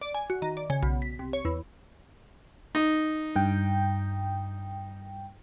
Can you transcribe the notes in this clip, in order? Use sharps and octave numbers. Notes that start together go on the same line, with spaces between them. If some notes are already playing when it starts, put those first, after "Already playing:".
D5
G#5
F#4
D#3
D5
C#3
B1
B6
C2
C#5
E2
D#4
G2 G5